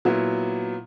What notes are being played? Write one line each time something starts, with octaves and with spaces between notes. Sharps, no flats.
A#2 F#3 B3 E4